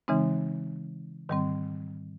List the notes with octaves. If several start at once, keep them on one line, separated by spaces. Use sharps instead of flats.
C#3 E3 G#3 C4 D#4
G#2 D#3 G3 C4